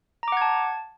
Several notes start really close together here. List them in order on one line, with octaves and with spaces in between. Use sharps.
A#5 D6 F#5 G#6 A5